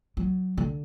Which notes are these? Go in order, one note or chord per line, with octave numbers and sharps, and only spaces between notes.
F#3
D3